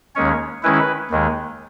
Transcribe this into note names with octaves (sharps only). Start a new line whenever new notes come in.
D#2 D#3 G#3 C#4 C#5
D#3 G#3 C#4 E4 B4
D#2 D#3 G#3